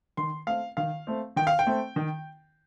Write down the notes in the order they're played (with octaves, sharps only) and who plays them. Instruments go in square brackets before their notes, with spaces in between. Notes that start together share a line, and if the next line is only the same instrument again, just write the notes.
[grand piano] D#3 C6
A3 C4 F5
D#3 F5
A3 C4
D#3 G5
F5
G5
A3 C4
D#3